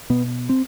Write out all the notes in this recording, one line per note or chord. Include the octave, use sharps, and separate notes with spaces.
B2 B3
C4